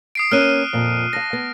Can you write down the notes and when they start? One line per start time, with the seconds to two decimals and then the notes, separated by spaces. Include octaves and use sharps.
0.15 D#6 C7 D7
0.31 A#3 B3 C#4 F6 F#6 D#7
0.73 F2 A#2
1.13 F5 A5 A#6
1.33 B3